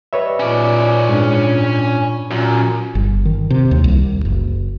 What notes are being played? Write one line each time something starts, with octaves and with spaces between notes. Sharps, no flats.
G3 B4 C#5 D#5 E5 E6
A#2 C#4 D5
G#2 D4
F#2 A#2
G1
D#3
C3
D#2
C2
F#1